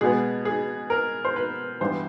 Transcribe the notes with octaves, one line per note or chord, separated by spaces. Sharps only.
B2 G#3 B3 G#4
G#4
A#4
C5
B4
G2 E3 G3 B3 C5